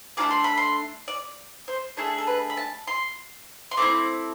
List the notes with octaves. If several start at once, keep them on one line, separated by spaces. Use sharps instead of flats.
A3 D4 F4 G#4 D6
C6
B5
C6
D5
C5
A3 D4 G#4 A4
A4
B4
B5
A5
C6
C6
A3 C4 E4 D6